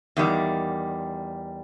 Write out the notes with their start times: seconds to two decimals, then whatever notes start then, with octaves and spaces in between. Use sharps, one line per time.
0.17 E2 D#3 G3